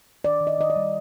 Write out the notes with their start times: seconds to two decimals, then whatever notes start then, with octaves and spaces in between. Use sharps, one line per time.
0.24 D#3 D5
0.41 D#3
0.47 D#5
0.59 D#3 D#5
0.70 D5
0.76 G3